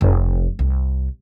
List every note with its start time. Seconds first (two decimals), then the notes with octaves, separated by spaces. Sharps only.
0.01 F1
0.59 C2